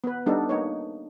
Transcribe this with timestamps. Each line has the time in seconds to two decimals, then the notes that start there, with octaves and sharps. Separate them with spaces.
0.04 B3 B4
0.26 G3 B3 D4 D#4 A4
0.49 A#3 D#4 C#5